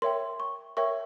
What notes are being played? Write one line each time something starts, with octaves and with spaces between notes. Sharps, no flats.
A#4 C#5 E5 G5 C6
C#6
A#4 C#5 E5 G5 C#6